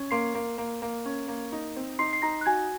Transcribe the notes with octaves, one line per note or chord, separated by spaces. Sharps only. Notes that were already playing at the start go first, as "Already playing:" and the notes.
Already playing: C#4
A#3 C6 C7
A#3
A#3
A#3
C#4
A#3
D#4
C4
D#4 C6 C7
C7
D#4 A#5 A#6
F#6
F#4 G#5 G#6